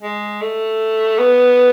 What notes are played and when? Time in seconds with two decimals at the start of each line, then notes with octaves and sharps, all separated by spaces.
0.03 G#3
0.42 A3
1.19 B3